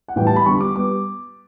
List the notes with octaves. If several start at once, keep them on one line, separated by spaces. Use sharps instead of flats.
F#5
A2 E3 G3 B3 G5
A5
B5
E2 D3 G3 C#6
D6
G3 B3 D6